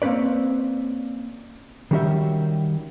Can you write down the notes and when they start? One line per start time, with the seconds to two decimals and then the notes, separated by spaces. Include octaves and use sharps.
0.02 A#3 C4 C#4 B4 D5
1.91 D#3 G3 C#4 F#4 G4 E5